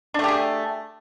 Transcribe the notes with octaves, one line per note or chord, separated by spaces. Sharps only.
A3 D4 G4 G#4